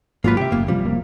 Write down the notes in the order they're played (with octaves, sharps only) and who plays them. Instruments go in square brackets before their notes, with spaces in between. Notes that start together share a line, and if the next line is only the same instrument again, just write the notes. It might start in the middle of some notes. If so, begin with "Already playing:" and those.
[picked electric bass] G#1 G#2 F#3 [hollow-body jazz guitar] A#3 F4 B4
[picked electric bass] A2 C3 [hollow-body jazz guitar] G4 E5
[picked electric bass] F#1 [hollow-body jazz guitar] A#3
[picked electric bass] A1 C3 F3 [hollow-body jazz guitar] G3
[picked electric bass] F1 C3 A#3